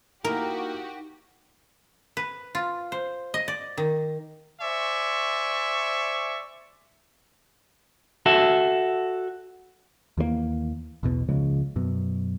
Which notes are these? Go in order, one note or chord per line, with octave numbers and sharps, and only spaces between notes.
A#3 D#4 E4 F#4 G4 A#4
B4
F4
C5
D#5
D5
D#3
C5 D5 E5 G#5 C#6
F#4 A4 E5
D#2 E3 G3 A#3
B1 E2 B2
C#2 C#3 F3 G#3
F#2 B2